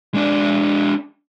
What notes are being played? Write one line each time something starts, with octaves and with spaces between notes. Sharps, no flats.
G#3 D4